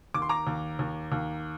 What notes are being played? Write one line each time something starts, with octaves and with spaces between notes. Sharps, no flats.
D#2 D6
C6
A#5 D6
D#2
D#2
D#2